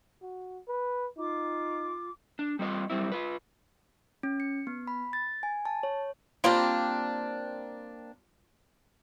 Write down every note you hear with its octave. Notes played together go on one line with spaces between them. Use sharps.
F#4
B4
D#4 F4 D6
D4
G3 C4 F4 D5 D#5
F#2 G3 G#3 C4 E4
F4 B4
C#4
C#7
B3
B5
A6
G#5
A5
C#5
G3 A#3 C4 D4 F4